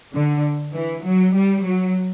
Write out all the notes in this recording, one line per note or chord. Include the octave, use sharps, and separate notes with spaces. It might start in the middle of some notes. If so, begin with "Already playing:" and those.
D3
E3
F#3
G3
F#3